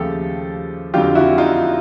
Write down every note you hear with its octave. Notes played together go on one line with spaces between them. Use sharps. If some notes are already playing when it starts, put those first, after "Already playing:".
Already playing: D#2 C#3 F3 A3 G4 A4
F2 D3 F#3 F4 G4
E4 F#4
D#4 F4